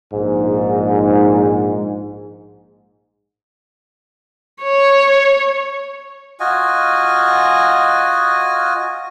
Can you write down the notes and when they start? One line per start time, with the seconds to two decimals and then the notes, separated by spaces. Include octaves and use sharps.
0.13 A#1 G#2
4.63 C#5
6.40 F4 F#4 D#5 G#5